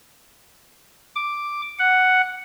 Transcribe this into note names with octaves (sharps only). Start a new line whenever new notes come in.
D6
F#5